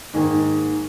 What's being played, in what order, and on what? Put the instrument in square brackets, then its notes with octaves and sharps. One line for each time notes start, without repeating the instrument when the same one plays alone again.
[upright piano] G#2 D#3 A#3 G#4